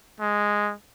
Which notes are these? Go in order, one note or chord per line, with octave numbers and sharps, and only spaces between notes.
G#3